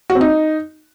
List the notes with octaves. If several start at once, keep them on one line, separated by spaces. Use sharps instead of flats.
F#4
C4
D#4